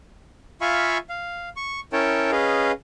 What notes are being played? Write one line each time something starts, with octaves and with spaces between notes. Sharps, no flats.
F4 E5 F5 G#5 B5 C#6
F5
C#6
C#4 E4 A#4 C#5 G5 A5
C#4 G#4 B4 D#5 F5